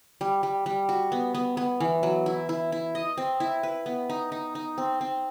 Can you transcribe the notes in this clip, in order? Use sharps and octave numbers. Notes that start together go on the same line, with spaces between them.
G3
G3
G3
F#4
B3
B3
B3
E3
F#3
E4
E4
E4
D#5
C4
E4
B4
B3
D#4
D#4
D#4
C4
C4